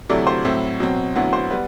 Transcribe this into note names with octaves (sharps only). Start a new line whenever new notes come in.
D2 C3 F#3 A3 E4 D5
C5
A2 F#3 C4 E4
B2 F#3 C4
D2 D3 F#3 B3 E4
C5
G3 B3 B4